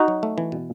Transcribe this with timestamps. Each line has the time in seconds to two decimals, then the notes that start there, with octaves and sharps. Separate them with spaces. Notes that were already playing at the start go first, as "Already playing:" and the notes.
Already playing: D#4 F#4
0.08 F#3
0.23 A3
0.38 E3
0.52 B2